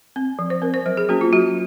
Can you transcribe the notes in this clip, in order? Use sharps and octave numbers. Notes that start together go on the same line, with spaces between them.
C4
F3
C5
C4 A#4
C5
F#3 C5
G#4
A#3 C#4 F#4
F4
F#3 F#4